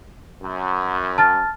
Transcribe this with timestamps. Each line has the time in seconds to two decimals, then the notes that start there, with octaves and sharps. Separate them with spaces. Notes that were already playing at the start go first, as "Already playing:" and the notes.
0.43 F#2
1.18 A5 F6 A6